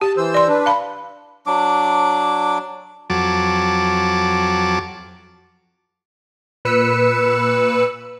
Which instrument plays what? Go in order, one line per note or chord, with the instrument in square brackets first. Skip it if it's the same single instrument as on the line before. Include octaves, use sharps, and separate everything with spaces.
[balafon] G4 [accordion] A5
[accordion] E3 C5 E6
[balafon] D5 C6
[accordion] D4 B4
[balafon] F5 B5
[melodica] F#3 D4 D6
[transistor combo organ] F2 F#3 A5 D6
[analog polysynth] A#2 B4 E6 C#7